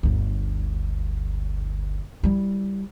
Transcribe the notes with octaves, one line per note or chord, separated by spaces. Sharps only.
G1 D2
G3 E4